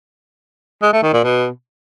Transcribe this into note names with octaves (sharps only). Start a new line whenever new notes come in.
G#3
A3
D#3
A#2
B2